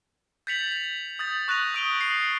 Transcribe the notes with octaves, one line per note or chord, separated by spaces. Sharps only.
G6 A6 B6 C#7 F7 F#7
D#6 G6 A6
C#6 F#6 A#6 D#7 F7
D#6 D7 F7 G7
C7